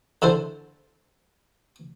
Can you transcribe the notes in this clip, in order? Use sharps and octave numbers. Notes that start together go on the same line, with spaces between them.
D3 E4 A4 C5